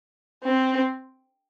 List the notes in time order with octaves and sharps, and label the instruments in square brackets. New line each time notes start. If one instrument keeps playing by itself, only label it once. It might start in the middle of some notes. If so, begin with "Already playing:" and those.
[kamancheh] C4